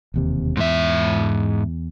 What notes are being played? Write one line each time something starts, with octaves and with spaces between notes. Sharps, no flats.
E1 D#2 C3
E2 G#2 E5